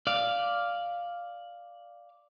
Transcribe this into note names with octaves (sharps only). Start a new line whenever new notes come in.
D5 F5